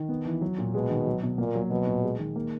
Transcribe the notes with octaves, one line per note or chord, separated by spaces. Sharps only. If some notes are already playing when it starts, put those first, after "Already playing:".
Already playing: D#3
B3
E3
F#3
A#2
B2 G#3
D#3
F#3
B2
A#2 A#3
F#3
B2 F#3
A#2
G#3
D#3
A#3